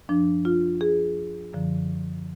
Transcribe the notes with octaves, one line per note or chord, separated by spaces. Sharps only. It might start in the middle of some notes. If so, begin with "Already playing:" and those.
F#2 F3 D4
F4
G#4
F#2 D3 F3